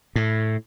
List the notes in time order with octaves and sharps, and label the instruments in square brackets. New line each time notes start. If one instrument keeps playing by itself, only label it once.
[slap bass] A2